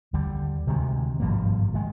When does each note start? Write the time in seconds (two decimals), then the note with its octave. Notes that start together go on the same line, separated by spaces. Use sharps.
0.13 D#2 D3 G3
0.67 D2 C3 D#3 G#3
1.20 G#1 G2 F3 A#3
1.74 D#3 G#3